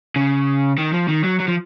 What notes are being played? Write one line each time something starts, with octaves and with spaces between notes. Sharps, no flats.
C#3
D#3
F3
D#3
F#3
F#3
F3